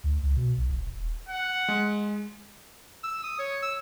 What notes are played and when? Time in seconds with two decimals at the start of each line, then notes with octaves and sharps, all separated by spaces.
0.04 D2
0.23 C#2
0.36 B2
0.58 B1
0.69 D#1
0.85 D#1
1.29 F#5
1.68 G#3
3.04 E6
3.24 D#6
3.39 C#5
3.62 E6